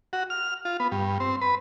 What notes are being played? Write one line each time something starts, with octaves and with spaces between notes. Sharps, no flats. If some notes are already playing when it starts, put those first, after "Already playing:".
F#4
F6
F4
B3
G2
C4
B4